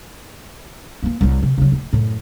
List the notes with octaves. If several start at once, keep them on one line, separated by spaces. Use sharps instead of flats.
E3 A#3
C2 F#3
C3
C#3 F#3
D1
F#2 A2